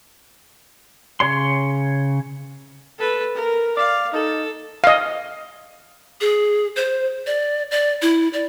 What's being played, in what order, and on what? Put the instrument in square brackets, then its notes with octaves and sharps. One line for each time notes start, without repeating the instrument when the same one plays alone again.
[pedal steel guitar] C#3 C#5 C6
[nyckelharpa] A4 B4
A#4
[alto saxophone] D5 [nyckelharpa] F5
[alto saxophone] D#4 [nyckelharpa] A4
[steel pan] D#5 F5
[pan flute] G#4
C5
D5
D5
E4
D5